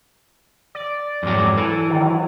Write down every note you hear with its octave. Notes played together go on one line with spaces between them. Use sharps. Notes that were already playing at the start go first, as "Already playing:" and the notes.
D5
F2 G#2 F#3
E3 A4
D#3
F#3